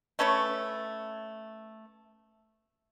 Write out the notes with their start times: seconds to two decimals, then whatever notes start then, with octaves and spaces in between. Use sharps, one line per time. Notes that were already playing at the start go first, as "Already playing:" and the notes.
0.19 A3 C#4 B4 C#5